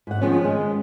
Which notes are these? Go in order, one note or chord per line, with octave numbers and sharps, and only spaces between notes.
G#2 F#5
D#3 F3 G#3 B3 C#4
G#3 D#5